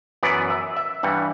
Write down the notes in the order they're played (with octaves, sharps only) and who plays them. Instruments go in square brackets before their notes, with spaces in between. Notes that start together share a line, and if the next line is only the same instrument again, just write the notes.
[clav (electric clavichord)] F#2 E3 B3 D5
E5
E5
G2 E3 G3 F#5